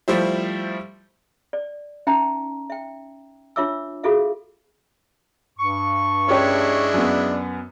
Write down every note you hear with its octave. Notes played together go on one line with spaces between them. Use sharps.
F3 G3 A3 E4 C5
D5
C#4 D#4 E5 G5 A5 A#5
E5 G5
D4 F4 C#5 E5 D6 E6
F4 F#4 G#4 A4 E5 F5
G2 C#6
G#3 C#4 D4 E4 G4 C#5
F#2 B3